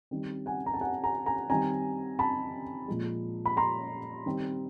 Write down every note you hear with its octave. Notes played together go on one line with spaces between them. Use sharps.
D#3 G3 C4
F#5 G#5
A#5
A5
F#5 G#5
G#5 A#5
G#5 A#5
D#3 G3 C4 G#5 A#5
A5 B5
A#2 F3 G#3
B5
A#5 C6
D#3 G3 C4